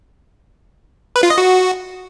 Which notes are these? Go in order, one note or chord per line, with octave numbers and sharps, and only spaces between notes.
B4
F4
D#5
F#4